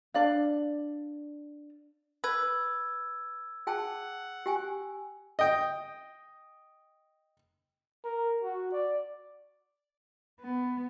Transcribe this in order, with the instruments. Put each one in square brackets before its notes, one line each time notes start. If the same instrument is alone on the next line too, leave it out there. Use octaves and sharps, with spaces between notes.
[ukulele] D4 D5 F5
[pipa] B4 [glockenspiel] E6 G#6
[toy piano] G#4 G5 A5 [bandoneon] F#5
[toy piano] G4 G5 G#5
[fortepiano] D#5 G5
[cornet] A#4
F#4
D5
[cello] B3